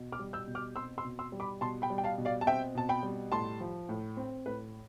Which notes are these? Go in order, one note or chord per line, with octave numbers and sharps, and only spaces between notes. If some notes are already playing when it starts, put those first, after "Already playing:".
Already playing: B2
D6 F6
G3
E6 G6
B2
D6 F6
C4 C6 E6
C6 E6
B2
C6 E6
G3
B5 D6
B2 A5 C6
G5 B5
G3
G5
F5 A5
B2
D5 F5
A5
C4 E5 G5
B2 A5
G5 B5
G3
A2 A5 C6
F3
A2
C4
A2 B4